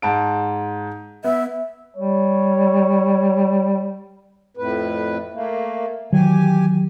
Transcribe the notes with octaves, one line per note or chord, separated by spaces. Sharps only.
G#2 A5 D7
B3 E5
G3 C#5
F2 A2 B4
A3 A#3
D#3 E3 F#3 G4 G#5